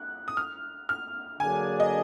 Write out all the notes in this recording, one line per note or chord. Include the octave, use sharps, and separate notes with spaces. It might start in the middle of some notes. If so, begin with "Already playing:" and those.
Already playing: F#6
D#6
F6
F6
D3 F#3 A#3 D4 G#4 G#5
D#5